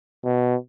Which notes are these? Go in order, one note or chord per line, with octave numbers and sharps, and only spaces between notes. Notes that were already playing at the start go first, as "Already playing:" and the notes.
B2